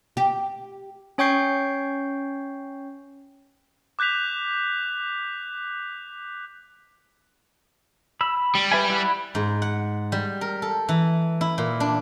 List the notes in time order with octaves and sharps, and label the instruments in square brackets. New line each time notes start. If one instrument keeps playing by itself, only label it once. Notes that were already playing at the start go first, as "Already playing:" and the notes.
[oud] G4
[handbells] C#4 C#5 G5 C#6 G6 C7
[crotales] D6 F#6 G6 B6 F7
[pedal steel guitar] B5 E6
[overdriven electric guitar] G3
[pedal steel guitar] B4 E5 G#5
E4 F#5 B5
[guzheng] G#2
F#5
G3
A#4
A4
E3
E4
A#2
D4